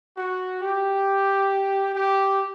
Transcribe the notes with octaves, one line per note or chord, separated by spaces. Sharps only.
F#4
G4
G4